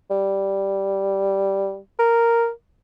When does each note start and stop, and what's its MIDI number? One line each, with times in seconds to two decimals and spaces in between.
0.10 1.78 55
1.99 2.50 70